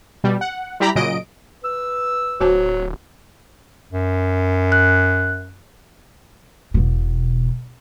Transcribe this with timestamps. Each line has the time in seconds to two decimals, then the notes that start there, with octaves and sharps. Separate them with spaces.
0.24 B2 G3
0.41 F#5
0.80 G3 E4 G4 A#5 B5 B6
0.95 A#2 C#3 F#3 D#5 D7
1.64 B4 E6
2.41 D1 F#3 F#4 C5 A5
3.93 F#2
4.72 F#6
6.74 E1 B2